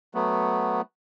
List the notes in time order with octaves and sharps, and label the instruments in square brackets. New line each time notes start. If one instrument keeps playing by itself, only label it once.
[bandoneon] F#3 A3 B3